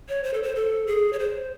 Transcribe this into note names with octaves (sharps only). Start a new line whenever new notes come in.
C#5
C5
A4
C5
A4
G#4
C#5
C5